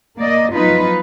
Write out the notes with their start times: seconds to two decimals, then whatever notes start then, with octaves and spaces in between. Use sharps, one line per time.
0.19 A#3 D5 D#5
0.55 F3 F#3 B3 D#4 F4 B4